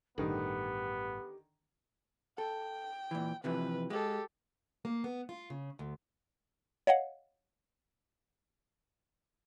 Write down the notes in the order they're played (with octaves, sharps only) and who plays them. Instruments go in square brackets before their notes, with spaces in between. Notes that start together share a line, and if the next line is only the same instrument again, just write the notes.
[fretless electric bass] A1 G2 [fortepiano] D3 D#3 [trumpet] B3 [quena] G4
[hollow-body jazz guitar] A4 [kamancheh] G5
[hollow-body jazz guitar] A#2 E3
[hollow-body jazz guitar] C3 E3 F3 [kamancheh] B4
[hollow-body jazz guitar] G#3 [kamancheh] G4 A4
[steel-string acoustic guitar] A#3
B3
F4
C#3
D2
[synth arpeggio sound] C#5 D#5 F5 F#5